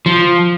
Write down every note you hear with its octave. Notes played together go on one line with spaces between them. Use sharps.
F3